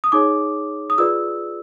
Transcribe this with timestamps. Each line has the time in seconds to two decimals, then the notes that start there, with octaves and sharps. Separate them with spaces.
0.04 D#6
0.12 D#4 G#4 C#5 D6
0.90 D#6
0.98 F4 G#4 B4 D5 E6